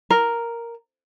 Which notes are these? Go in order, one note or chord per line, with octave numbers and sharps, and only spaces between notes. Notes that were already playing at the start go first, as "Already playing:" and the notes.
A#4